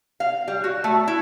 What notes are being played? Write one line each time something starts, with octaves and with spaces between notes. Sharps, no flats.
F5
G3
F#4
A3
E4